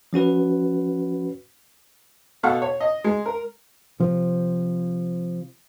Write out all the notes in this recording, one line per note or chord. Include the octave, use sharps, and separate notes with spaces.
F3 C#4 F#4 B4
B2 A4 F5 F#5 C#6
C#5
D#5
G#3
A#4
C3 F3